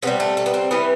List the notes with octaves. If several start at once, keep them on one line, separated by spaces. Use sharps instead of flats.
C3 E3 G3 B3
A3
A3
B3
C4
C3 E3 G3 B3